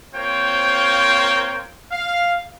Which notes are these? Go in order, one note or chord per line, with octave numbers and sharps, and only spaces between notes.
A#3 C4 F4 C5 C#5 G5
F5